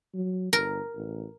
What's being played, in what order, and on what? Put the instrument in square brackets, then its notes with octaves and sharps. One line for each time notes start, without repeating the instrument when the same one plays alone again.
[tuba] F#3
[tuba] G1 [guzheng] A#4
[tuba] A1